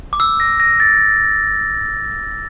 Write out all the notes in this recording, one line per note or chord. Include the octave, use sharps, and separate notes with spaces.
D6
E6
A#6
A#6
A6